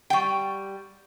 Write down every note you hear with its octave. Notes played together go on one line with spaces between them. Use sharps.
G3 F#5 G5 C#6